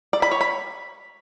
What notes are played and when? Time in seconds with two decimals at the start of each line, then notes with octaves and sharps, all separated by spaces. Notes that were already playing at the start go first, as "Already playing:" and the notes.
0.13 D5
0.22 B5
0.31 C#5
0.41 B5